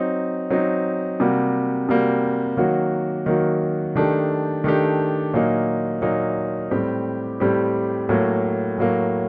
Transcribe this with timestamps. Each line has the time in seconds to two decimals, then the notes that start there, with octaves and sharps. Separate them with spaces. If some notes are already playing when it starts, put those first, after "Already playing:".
Already playing: F#3 C4 D#4
0.50 F#3 C4 D#4
1.20 C3 G3 A#3 F#4
1.89 C3 G3 A#3 F#4
2.57 D#3 F#3 A#3 F#4
3.26 D#3 F#3 A#3 F#4
3.96 D#3 A3 D4 G4
4.64 D#3 A3 D4 G4
5.34 A#2 F#3 A#3 D#4
6.02 A#2 F#3 A#3 D#4
6.71 A2 G3 C4 G4
7.40 A2 G3 C4 G4
8.09 A2 F#3 A#3
8.78 A2 F#3 A#3